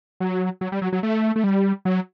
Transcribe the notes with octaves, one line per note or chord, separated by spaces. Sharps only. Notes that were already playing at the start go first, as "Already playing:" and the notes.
F#3
F#3
G3
F#3
F#3
A3
A3
G3
F#3